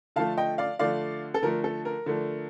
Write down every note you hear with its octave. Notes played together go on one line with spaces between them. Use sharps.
D3 F3 A3 F5 A5
D#5 G5
D5 F5
D3 F3 A3 D5 F5
A4
D3 F3 A3 A#4
A4
A#4
D3 F3 A3